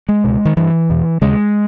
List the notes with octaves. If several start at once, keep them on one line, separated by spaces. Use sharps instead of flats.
G#3
C#2 B2
D#3
G2 E3
E2 B2
D#2 C#3 G#3